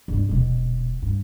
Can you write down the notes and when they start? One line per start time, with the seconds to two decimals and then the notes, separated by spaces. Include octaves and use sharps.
0.08 G2 G#3
0.29 D#1 B2
1.02 G2